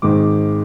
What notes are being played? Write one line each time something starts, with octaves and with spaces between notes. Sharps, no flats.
G#1 G#2 D#3 G#3 D6